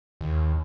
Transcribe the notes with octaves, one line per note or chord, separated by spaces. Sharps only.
D#2